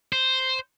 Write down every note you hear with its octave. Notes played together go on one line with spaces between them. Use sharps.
C5